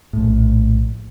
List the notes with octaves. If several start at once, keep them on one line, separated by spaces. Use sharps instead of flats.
A#1 A2